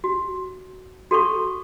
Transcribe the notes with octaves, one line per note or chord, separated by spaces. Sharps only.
F#4
F#4 A4 C6 C#6